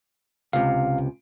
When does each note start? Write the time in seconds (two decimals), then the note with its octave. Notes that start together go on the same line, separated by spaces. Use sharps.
0.53 C#2 C3 F5